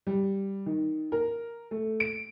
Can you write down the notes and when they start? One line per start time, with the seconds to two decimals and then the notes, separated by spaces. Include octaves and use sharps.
0.07 G3
0.66 D#3
1.12 A#4
1.71 A3
2.00 D7